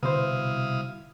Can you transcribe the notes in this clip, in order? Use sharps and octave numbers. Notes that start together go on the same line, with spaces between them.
C2 B2 D3 E4 C5 F5 D#6